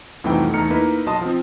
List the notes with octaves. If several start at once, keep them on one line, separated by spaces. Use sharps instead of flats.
C2 F2 E3 A3 D#4 G5
E2 A3 D#4 A#5 F6 C#7
A#3 D#4 E4 B4
B1 F#4 D#5 A5 C6 D#6
F3 C4